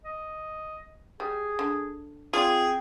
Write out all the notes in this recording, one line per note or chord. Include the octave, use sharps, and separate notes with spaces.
D#5
G3 G#4
D3
C4 F4 G#4 D5